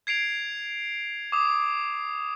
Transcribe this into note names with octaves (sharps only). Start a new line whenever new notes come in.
G#6 C7 D7 F7
D6 D#6